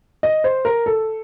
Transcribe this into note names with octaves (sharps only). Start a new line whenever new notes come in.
D#5
C5
A#4
A4